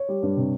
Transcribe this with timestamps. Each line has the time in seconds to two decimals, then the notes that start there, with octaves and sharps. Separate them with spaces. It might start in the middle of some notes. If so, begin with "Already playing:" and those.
Already playing: C#5
0.09 G3
0.23 G2
0.37 C3